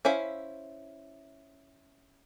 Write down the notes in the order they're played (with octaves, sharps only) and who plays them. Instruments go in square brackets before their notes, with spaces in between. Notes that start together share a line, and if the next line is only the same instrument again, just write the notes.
[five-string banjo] C#4 E4 C5 E5 F5